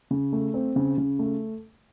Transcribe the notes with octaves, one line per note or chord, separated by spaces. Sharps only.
C#3
A3
C4
C#3
C#3
A3